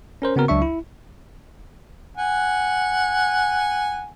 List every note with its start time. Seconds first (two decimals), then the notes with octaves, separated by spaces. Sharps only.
0.22 C#4 A#4 C5
0.36 C#3 B3 C4 F#4 A#4
0.48 C#2 F#3 D4 E5 C#6
0.62 E4
2.17 F#5 G#5